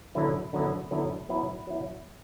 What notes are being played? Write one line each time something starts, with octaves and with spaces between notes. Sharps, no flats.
D3 F#3 B3 E4
D3 F#3 B3 E4
D3 F#3 B3 E4
F#3 B3 E4
F#3 B3 E4